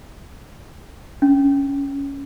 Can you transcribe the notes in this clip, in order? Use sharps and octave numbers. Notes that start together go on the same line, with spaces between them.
C#4